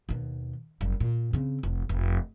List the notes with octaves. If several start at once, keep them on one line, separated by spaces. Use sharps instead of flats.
D#2 B2
F#1 G3
A#2
C#3 C4
F1
F1